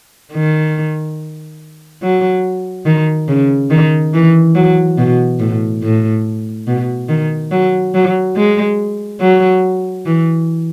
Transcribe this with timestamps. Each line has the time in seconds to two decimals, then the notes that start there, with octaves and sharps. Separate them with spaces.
0.33 D#3
2.02 F#3
2.86 D#3
3.28 C#3
3.70 D#3
4.13 E3
4.55 F#3
4.98 B2
5.39 A2
5.82 A2
6.67 B2
7.09 D#3
7.51 F#3
7.94 F#3
8.36 G#3
9.21 F#3
10.06 E3